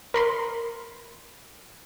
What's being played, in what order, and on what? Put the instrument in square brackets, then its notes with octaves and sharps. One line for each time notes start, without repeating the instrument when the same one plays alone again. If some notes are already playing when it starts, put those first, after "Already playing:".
[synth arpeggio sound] A#4 B5 C6